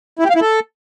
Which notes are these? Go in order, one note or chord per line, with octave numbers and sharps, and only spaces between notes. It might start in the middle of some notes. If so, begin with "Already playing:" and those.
E4
G4
F5
E4
A4